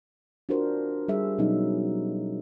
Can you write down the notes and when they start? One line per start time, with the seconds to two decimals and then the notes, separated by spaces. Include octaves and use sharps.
0.49 D4 F4 F#4 A#4 C5
1.08 G3 G#4 E5
1.38 B2 F#3 C#4 D#4